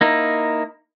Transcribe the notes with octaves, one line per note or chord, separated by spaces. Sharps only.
A#3 D#4 E4